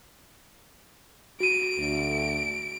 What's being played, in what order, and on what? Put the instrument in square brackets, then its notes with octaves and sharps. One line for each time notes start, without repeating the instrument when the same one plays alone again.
[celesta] F#4 D#7 [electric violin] D7
[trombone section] D2